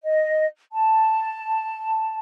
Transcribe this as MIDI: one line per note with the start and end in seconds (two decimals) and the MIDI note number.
0.03 0.47 75
0.72 2.19 81